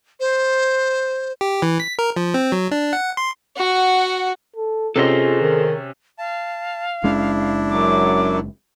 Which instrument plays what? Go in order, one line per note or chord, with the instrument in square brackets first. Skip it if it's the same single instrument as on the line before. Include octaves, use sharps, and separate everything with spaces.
[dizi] C5
[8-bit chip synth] G4
E3
B6
A#4
F3
C4
F#3
D4
F#5
C6
[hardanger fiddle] F#4 F#5
[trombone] A4
[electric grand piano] C3 C#4 [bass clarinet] F4 [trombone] G#4 [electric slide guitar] A4 C5 D#5
[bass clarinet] D#3
[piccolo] F5 [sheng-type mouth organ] A5
[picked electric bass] F#1 G#3 C#4 [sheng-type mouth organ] D4 E4
[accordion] F#2 F#3 [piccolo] D6